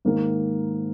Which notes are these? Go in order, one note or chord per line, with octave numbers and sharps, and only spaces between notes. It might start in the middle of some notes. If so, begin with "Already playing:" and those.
G#2 D#3 A#3 D#4 A#4